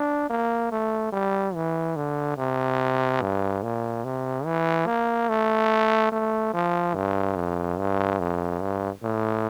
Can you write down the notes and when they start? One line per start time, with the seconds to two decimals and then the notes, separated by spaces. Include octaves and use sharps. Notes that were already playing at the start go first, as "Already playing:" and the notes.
Already playing: D4
0.30 A#3
0.71 A3
1.12 G3
1.55 E3
1.96 D3
2.37 C3
3.21 G2
3.63 A#2
4.04 C3
4.45 E3
4.86 A#3
5.29 A3
6.12 A3
6.53 F3
6.95 G2
7.36 F2
7.79 G2
8.19 F2
8.61 G2
9.03 A2